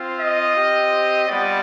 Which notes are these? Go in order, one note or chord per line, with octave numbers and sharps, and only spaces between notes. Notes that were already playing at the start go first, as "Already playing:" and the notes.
Already playing: C4 F4
D#5
C4 G4
G3 B3 F4 D5